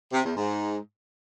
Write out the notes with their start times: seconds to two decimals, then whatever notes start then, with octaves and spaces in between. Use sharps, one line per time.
0.12 C3
0.24 E2
0.35 G#2